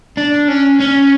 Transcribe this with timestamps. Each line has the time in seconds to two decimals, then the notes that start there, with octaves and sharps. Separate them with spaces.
0.17 D4
0.48 C#4
0.80 C#4